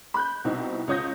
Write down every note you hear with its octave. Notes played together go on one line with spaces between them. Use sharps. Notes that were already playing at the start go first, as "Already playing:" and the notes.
B5 F#6 G6
C2 B2 C4 D#4 E4
C#2 F4 C#5 D#6 G6 A#6